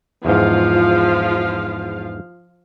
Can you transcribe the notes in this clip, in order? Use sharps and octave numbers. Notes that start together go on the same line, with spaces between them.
E2 G#2 F3 F4 F5